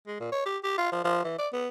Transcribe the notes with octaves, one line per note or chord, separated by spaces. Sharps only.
G#3
A#2
C#5
G4
G4
F4
F3
F3
E3
D5
B3